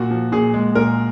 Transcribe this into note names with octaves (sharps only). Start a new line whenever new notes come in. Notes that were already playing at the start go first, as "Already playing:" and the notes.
Already playing: A#2 F#4
F3
A#2 G#4
G#3
A#2 A#4